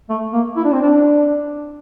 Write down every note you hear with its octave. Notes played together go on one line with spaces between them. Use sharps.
A3
A#3
E4
D4
C4
D4